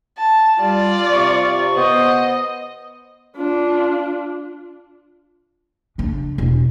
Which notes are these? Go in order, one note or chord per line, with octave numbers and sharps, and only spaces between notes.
A5
G3 F4 D5
C3 C#6
B3 C5 D#5
D4 F4
C#3 D4
E1